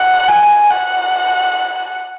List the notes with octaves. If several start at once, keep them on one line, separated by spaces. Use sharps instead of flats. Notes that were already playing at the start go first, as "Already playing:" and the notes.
Already playing: F#5
G#5
F#5